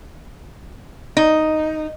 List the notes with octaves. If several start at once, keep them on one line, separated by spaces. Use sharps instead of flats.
D#4